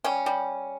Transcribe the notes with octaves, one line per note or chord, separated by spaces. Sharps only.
G3 C#4
G3